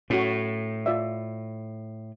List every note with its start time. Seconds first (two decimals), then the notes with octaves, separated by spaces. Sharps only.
0.10 A2 C#4 F#4
0.86 F4 D5 E5